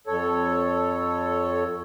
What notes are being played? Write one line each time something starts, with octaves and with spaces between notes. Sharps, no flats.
F2 A4 C#5